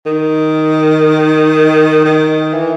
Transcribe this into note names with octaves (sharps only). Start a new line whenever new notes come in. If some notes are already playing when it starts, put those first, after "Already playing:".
D#3
D#3
E3